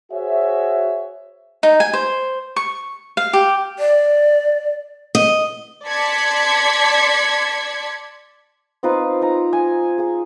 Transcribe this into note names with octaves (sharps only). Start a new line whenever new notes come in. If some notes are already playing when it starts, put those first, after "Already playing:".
F#4 G#4 C5 C#5 E5
D#4
G#5
C5
C#6
F5
G4
D5
D#5
D5 A5 C6 G#6 B6 C#7
C4 D#4 F4 B4
D#4 A#5
G#5
G#4 G#5